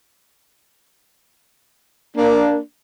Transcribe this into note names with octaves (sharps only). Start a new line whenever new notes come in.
A#3 D4